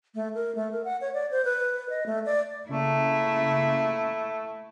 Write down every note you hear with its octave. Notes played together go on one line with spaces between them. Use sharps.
A3
A#4
A3
A#4
F#5
C#5
D5
C5
B4
D#5
A3
D5
C#3 A3 A#3 E4